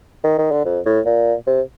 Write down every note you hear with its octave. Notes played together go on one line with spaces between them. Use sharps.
D#3
D#3
D3
F2
A2
A#2
C3